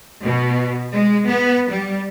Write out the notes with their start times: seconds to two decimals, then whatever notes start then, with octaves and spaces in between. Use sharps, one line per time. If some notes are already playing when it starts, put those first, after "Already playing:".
0.23 B2
0.94 G#3
1.27 B3
1.70 G3